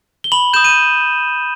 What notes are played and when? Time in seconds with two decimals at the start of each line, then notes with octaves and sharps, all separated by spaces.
0.24 G7
0.32 B5 F#7
0.54 G6 E7
0.56 D#6
0.64 D#7